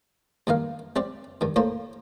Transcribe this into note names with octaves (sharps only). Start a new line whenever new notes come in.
G2 D#3 A#3 F5
G3 C4 D5
G2 D#3
A2 A#3 C5